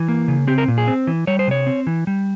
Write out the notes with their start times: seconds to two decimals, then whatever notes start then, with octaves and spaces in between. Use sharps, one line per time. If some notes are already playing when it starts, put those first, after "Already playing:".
Already playing: E3
0.08 A#3
0.28 C#3
0.47 C4 G4
0.58 A#4
0.68 A#2
0.78 G#4
0.88 C4
1.07 E3
1.27 G3 C#5
1.39 C5
1.48 C3 C#5
1.67 C4
1.87 E3
2.07 G3